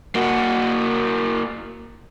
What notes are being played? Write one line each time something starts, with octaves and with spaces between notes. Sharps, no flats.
A#3 F#4